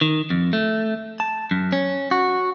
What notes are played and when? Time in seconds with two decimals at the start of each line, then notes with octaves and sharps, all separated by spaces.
0.01 D#3
0.30 F2
0.53 A3
1.20 A5
1.51 F#2
1.72 C#4
2.11 F#4